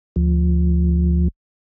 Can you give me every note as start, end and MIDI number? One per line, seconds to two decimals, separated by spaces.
0.16 1.28 38
0.16 1.28 53